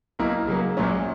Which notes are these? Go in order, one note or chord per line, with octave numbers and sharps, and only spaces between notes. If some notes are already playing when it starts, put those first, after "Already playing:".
B1 B2 A#3 E4 A#4
C#3 F#3 A#3
A#1 A#2 F#3 C#4